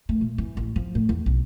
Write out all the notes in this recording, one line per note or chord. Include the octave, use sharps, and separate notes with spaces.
A3
A#2
E3
A1
F3
A2
E2
B1